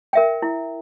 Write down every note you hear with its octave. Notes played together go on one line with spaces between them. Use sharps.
A#4 E5 G5
E4